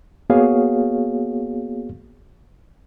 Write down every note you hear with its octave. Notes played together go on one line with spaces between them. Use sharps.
A#3 B3 F#4 G#4 C#5 F5